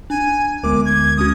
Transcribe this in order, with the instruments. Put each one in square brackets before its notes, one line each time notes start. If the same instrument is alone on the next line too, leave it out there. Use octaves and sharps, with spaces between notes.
[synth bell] D4 [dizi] G#5
[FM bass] D2 [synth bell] G#3 B3 A#4 [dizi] D6
[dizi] G#6
[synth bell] G#3 C#4 F#4 [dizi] D#6